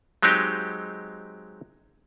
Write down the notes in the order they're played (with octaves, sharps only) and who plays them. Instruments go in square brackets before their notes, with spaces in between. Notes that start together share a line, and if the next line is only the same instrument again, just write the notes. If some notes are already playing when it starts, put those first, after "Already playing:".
[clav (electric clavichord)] F#3 G#3 C4 D#4 G4